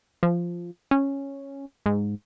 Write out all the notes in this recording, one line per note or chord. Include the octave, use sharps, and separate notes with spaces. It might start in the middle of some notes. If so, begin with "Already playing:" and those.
F3
C#4
G#2